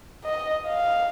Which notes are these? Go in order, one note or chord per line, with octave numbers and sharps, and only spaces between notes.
D#5
F5